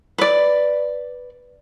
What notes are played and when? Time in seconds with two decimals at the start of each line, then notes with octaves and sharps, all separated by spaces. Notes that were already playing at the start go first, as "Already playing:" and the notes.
0.18 B4 D5